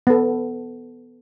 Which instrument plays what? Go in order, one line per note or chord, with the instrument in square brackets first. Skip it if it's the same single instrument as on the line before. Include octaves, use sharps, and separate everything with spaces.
[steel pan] B3 A4